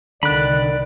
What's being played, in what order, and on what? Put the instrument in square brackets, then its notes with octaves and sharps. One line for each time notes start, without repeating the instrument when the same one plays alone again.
[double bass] C2 D#3 [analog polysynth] D3 [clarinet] D5 [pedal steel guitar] B5 F#6